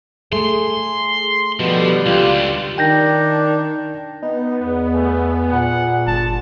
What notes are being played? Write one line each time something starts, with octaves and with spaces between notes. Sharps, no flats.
A3 G#4 C6
B2 D3 F3 G3 G4
C#2 F4
D#3 D4 G5 G6 A#6
B3 D#4
E2 B3
A3 G#4
A#2 F#5
G1 A5